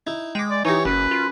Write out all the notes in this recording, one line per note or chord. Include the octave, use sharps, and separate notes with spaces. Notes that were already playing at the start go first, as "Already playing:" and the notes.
D#4 E4
G#3 G5 D6
D5
E3 D#4 E4 G4 C#5
F#1 F#2 B4
F4